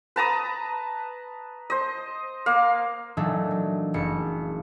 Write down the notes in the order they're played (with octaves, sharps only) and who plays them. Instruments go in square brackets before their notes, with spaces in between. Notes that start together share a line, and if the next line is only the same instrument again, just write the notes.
[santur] B4 A5 A#5 D#6
C5 D#5
A#3 F5
[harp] A#2 E3 F#3 A3 D4 D#4
F#3
F#1 C#7